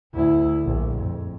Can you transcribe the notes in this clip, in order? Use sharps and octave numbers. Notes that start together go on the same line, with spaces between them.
D2 E4
A#1
F2